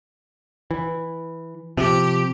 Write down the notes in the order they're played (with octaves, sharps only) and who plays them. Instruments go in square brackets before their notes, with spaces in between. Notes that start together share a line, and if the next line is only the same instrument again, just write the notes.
[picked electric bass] E3
[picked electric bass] C3 F3 [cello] G4